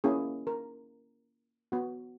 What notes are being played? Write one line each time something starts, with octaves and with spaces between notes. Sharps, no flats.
A#3 C#4 E4 G#4
A#4
B3 F#4